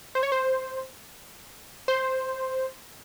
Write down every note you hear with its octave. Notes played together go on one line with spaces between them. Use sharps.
C5
C#5
C5
C5